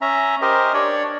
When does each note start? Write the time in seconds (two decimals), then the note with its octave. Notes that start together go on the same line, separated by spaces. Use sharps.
0.01 C#4 E5 A#5
0.42 G4 A#4 C5 D#5
0.74 D4 C#5 D5